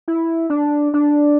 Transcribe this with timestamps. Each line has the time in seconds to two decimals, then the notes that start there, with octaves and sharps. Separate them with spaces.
0.08 E4
0.50 D4
0.94 D4